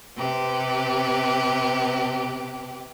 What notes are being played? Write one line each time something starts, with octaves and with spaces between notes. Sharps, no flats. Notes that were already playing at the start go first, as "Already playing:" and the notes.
C3 G4 B4